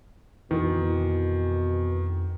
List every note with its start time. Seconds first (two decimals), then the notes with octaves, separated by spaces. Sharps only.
0.51 F2 B2 D#3 E3